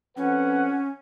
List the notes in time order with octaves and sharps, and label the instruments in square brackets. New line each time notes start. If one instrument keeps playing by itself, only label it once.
[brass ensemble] F2 B4 F#5 [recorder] C#4